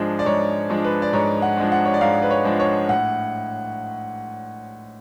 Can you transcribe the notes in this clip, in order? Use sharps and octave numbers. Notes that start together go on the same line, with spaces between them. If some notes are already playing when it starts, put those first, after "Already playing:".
Already playing: G#2 F3 G#3 D4
D5
G#2 C#5
F3 G#3 D4
B4
D5
G#2 C#5
F#5
F3 G#3 D4
F#5
C#5
D5
G#2 F5
B4
C#5
F3 G#3 D4
C#5
A2 F#5